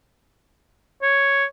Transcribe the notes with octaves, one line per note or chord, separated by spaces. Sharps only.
C#5